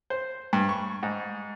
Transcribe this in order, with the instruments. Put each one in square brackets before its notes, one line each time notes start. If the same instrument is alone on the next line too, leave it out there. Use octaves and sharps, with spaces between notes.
[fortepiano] C5
G2
C#6
G#2